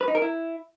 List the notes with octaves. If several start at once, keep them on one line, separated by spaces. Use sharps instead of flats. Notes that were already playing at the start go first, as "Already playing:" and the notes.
B4
D#4
A#4
E4